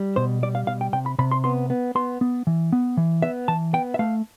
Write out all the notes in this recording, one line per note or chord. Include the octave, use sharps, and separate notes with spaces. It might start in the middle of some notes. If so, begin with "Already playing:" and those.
Already playing: G3
B2 C5
G3 D5
F5
B2 F5
G5
C3 G5
B5
C3 B5
C6
B3 C6
B3
B3 C6
B3
E3
B3
E3
B3 E5
E3 A5
B3 G5
E5
A3 F5